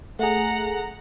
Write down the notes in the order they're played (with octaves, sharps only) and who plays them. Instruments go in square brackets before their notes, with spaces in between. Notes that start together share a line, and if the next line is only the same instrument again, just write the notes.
[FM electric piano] A3 G#4 [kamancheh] F#5 A#5